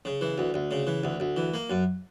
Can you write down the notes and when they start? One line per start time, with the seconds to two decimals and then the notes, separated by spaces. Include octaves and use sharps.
0.05 C#3
0.21 E3
0.38 D2
0.54 D2
0.71 C#3
0.87 E3
1.04 D2
1.20 D2
1.37 E3
1.54 A#3
1.70 F#2